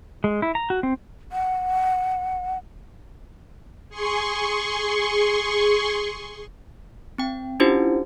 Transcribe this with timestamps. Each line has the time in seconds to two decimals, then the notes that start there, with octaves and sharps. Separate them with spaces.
0.24 G#3
0.42 E4
0.55 A#5
0.70 F#4
0.83 C4
1.32 F#5
3.89 G#4 C6 C#6
7.18 C4 G5
7.60 C#4 D4 E4 F4 G4 C5